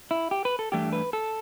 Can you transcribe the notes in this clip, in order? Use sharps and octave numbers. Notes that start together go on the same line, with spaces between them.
E4
G4
B4
A4
G2 E3 A3 D4 G4
B4
A4